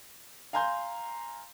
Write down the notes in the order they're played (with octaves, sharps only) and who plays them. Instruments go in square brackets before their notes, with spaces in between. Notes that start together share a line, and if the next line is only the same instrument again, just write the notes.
[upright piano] F5 G#5 A#5 C6 G6